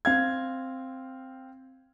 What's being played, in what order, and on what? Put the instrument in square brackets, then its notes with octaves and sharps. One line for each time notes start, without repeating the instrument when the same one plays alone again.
[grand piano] C4 F5 G#6